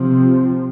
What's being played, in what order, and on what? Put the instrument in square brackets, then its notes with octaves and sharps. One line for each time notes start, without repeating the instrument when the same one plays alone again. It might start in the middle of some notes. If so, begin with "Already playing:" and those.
Already playing: [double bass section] C3 F3 C4